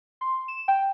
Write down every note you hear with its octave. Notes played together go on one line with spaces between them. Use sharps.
C6
E7
G5